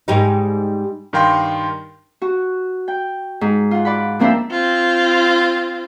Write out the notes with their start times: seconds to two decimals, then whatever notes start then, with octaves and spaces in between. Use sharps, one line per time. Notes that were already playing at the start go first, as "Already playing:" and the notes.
0.08 G#2 G3 D#4
1.13 G2 D#3 A#4 F5 G5 C6
2.22 F#4
2.88 G5
3.41 G#2
3.71 F4 F#5
3.85 D5 F#5 B5
4.19 F3 A#3 C4 D4 C5 E5
4.51 C4 F4